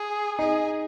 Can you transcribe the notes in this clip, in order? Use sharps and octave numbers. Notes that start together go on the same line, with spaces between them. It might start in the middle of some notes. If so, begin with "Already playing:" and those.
Already playing: G#4
D#4 G#4